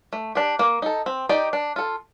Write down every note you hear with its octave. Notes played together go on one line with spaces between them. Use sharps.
A3
D4 G4
A#3
D#4 A4
C4
D#4 G4 D5
D4
F4 A4